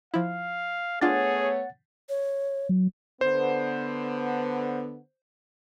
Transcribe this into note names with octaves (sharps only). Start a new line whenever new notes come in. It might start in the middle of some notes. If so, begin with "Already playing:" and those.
F3 E4 F5
A3 B3 D4 F4 G#4 C#5 F#5 A6
C#5
F#3
D3 B3 C5